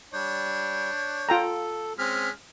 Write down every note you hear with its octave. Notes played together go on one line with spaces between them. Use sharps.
G3 D4 C#5 G6
F4 A4 G5 A#5
G#3 C4 C#4 F6 B6